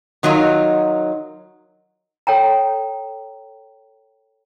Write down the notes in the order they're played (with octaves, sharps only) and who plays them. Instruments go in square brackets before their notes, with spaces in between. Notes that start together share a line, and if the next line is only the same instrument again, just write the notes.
[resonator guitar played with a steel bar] D#3 F#3 D#4 F4
[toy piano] A4 C#5 G5 A#5